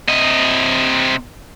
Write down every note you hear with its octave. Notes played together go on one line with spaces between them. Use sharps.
C3 D#5